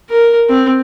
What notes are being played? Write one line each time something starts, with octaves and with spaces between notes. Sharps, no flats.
A#4
C4